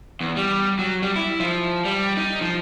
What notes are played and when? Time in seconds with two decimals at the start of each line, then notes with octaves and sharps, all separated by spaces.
0.20 E2
0.36 G3
0.79 F#3
1.03 G3
1.16 E4
1.40 F3
1.85 G3
2.17 D#4
2.41 F3